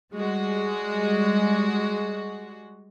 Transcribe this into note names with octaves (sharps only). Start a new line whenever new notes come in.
G3 G#3 F#4